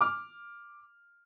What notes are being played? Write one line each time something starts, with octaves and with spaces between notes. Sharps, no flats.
D6 F6